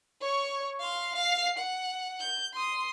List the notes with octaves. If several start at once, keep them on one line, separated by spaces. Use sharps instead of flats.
C#5 C#6
F5 C6
F5 C7
F#5
G6
C6 D#6